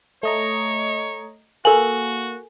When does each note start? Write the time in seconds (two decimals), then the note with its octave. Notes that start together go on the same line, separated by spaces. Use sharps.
0.23 A3 C#5 D#5 A#5
1.65 A#3 F#4 A4 B4 G#5 F#7